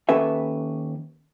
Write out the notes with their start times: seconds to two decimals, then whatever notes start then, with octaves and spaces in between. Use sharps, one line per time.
0.09 D#2 C#4 A4 B4 E5